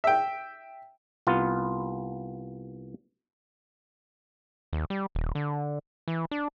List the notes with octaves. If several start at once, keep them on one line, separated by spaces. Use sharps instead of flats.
E5 G5
C2 B3 F4
D#2
G3
D#1
D3
E3
D4